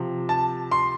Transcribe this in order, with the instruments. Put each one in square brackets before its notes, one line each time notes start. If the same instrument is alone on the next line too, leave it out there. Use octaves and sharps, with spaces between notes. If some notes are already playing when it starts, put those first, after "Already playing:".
Already playing: [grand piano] C3 F3
A5
C6